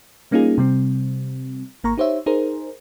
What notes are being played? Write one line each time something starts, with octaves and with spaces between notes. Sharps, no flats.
G3 A#3 C#4 D#4 F4 G#4
C3 G3 C4
G#1 A#3 A#5 C#6
D#4 G4 C5 C#5 E5
D#4 G#4 A#4 C5